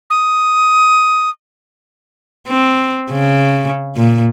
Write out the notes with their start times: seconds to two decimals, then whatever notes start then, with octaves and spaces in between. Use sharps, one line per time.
0.10 D#6
2.48 C4
3.11 C#3
3.96 A#2